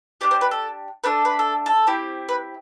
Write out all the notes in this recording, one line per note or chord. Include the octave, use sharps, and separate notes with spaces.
D4 G4 D5
C5
B4
A4
A3 D4 A4 B4
B4
A4
A4
C4 E4 G4
B4